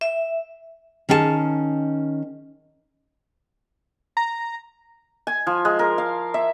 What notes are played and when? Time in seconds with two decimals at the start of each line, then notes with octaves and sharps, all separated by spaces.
0.01 E5
1.09 D#3 C#4 G#4 G5 A5
4.17 A#5
5.27 G#5
5.47 F3
5.65 G#3
5.79 A#4
5.98 F5
6.34 E5